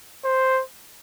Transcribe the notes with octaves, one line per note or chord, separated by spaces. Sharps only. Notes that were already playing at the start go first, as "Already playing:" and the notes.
C5